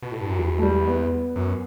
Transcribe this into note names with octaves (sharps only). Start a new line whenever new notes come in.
B2
A2
G2
F#2
E2 F#3
A3
G3
B3
F#2